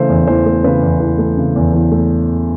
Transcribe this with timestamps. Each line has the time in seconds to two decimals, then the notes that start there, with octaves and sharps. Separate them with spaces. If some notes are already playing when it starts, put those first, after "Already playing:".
Already playing: C#3 E3 A3 C5
0.09 E2
0.27 E3 C5
0.46 A3
0.64 C#3 B4
0.83 E2
1.00 E3
1.18 A3
1.37 C#3
1.56 E2
1.73 E3
1.92 A3